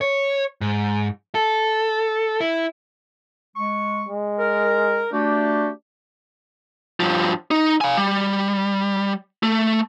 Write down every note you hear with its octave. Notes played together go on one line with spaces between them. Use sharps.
C#5
G#2
A4
E4
G#3 C#6
G#3
A#4
A3 D4 F#4 G4
G2 F3
D#4
F5 G#5
G3
A3